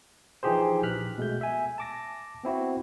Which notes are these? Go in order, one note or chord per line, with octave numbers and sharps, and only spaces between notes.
E3 F3 D#4 G4 G#4 C5
A#1 F6 F#6 B6
B2 G#3 A3 G6
E5 G#5
A5 D6 A#6
B3 C4 E4 F#4